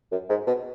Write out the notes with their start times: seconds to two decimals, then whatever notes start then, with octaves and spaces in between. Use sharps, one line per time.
0.11 F#2
0.29 G#2
0.47 B2